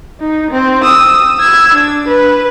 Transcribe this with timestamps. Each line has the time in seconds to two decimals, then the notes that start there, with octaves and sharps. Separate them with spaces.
0.20 D#4
0.51 C4
0.83 D#6 E6
1.40 E6 G#6
1.75 D4
2.08 B4